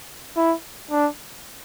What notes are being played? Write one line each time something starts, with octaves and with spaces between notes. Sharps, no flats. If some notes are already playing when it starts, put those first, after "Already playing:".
E4
D4